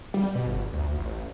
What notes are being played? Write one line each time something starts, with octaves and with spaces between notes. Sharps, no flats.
G3
B2
G1
D2
A1